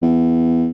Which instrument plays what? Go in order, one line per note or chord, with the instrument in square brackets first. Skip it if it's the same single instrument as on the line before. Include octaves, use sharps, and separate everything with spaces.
[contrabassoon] E2